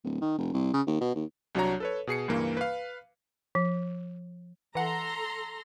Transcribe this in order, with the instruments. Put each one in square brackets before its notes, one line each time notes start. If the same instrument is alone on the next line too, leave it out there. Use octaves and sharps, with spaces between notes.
[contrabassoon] D1
D#3
F1
C2
C#3
D#2
B2
D#2
[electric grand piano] C2 F#3 D4 F#4 C#5 A#5
A4 B4 C#5
B2 G#4 C7 C#7
C#2 G2 E3 A#3
B4 F5
[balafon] F3
[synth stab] E3 F#5 [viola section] A4 A#5 C6